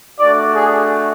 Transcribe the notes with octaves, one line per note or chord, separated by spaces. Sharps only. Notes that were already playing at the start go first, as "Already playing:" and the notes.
A3 D4 F#4 D5
G#4